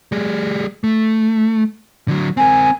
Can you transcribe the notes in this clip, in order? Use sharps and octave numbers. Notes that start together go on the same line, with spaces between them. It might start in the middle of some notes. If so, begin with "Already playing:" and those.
G3 G#4
A3
D3 F#3
C4 A#4 G#5